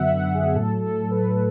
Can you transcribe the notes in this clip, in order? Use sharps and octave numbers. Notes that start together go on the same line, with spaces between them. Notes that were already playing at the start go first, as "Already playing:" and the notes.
Already playing: F#2 D3 F#3 B3 E5 F#5
F#5
G#4
A2 F#3 A3 A4
A4
B4